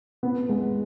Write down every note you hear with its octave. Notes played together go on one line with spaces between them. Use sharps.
B3
G#3